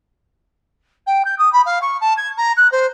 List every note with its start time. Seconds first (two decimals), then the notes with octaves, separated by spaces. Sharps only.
1.06 G5
1.25 G6
1.38 D#6
1.53 B5
1.66 F5
1.81 C#6
2.01 A5
2.17 G#6
2.37 A#5
2.57 F#6
2.72 C5